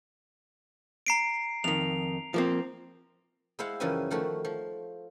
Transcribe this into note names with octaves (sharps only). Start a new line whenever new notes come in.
A#5 C7 D7
F2 D#3 F7
F3 A#3 C4
G#3 E4 C5 F5 F#5
F#2 C#3 E3 F3 G3 G#5
D#3 F3 A3 F#4
F3